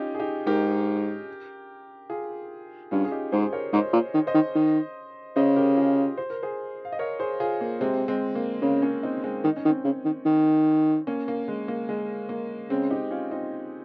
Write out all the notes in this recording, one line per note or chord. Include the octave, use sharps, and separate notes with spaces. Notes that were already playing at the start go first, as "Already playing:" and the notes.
Already playing: C#4 D#4 F4 G4
G#4
D#4 G4
G#2 G4 A#4
F4 G#4
G2 C#4 F4
G#4
D#4 G4
G#2 G#4 C5
A#4 C#5
G#2 C5 D#5
A#2
D#3
C5 D#5
D#3
D#3
C#3 C5 D#5
G4 A#4
F4 G#4
C5
A#4
G#4 C5
F5
D#5
A#4 C#5
G#4 C5
F4 G#4
A#3
C3 G#3 C4
G#3 C4
A#3
C#3 A#3
A#3 C#4
C4 D#4
G#3 C4
D#3 D#4
C#4
D#3
C4 D#4
C#3
D#3
D#3
A#3 C#4
A#3
G#3
A#3
G#3
A#3
C#3 G#3 C4
D#4 G4
C#4 F4
C4 D#4